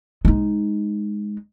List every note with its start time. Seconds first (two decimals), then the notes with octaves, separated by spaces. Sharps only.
0.25 G#3 D#4